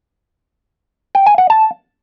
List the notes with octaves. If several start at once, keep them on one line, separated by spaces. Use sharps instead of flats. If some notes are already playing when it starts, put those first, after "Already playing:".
G5
G#5
F#5
A5